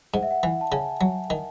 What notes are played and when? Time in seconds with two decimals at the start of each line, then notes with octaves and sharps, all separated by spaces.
0.14 G#2 F#5
0.23 E5
0.31 F#5
0.43 E3
0.61 A5
0.72 C#3 G#5
1.01 F#3
1.30 D#3